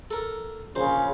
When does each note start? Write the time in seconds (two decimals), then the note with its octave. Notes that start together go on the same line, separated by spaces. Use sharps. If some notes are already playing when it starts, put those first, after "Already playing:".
0.11 A4 A#4
0.76 A#1 C#3 C5